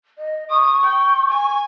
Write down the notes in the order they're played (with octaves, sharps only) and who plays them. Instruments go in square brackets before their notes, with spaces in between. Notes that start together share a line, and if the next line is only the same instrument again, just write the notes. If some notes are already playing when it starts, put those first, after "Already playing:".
[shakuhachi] D#5
[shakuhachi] C#6 [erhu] D#6
[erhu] G5
G#5